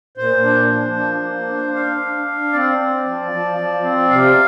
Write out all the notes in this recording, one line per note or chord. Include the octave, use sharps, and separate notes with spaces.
A#2 C5
D4
F3
D4
A#3
D4
D4 F5
D4
D4
C4 D5
C4
F3
F3
F3
C4
C3 F5